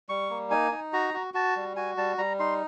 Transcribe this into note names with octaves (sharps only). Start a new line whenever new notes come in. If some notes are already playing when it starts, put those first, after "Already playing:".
G3 C#6
A#3
D#4 G#5
D#4
F#4 A#5
F#4
F#4 A5
G3
F#4 G#5
G3 A5
G3 A#5
D#4 C6